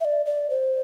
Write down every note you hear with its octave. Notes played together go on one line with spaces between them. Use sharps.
E5
D5
D5
C5